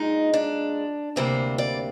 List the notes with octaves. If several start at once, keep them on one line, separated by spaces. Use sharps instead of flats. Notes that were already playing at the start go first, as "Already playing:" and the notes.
Already playing: A#2 G#3 D#4
D4
D2 C3 G3 A#3 C5
D5